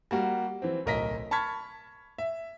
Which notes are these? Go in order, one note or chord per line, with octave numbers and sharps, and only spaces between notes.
G3 A#3 F#4
E3 C4
D1 B1 A#4 D#5 A#6 B6
A5 B5 C#6 F6 G#6 B6
E5